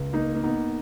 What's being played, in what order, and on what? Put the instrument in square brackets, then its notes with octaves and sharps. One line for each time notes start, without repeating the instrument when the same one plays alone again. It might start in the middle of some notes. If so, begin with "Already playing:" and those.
Already playing: [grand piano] C#2
[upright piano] A#3 [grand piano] D#4
[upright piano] A#3
[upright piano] B3 [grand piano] D#4